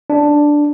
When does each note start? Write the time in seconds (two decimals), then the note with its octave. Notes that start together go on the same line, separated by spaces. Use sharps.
0.10 D4